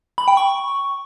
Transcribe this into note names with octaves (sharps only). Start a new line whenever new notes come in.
B5
G5
C#6